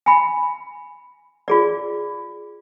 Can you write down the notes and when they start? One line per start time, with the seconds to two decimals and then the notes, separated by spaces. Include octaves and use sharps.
0.06 G#5 B5
1.48 F4 G#4 D5